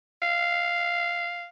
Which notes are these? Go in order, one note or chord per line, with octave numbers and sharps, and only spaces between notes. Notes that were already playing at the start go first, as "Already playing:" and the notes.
F5